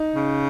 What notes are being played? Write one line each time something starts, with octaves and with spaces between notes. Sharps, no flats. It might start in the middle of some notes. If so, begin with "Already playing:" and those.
Already playing: D#4
C#3